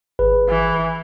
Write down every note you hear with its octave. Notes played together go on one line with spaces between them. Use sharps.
G#1 G#4 B4
E3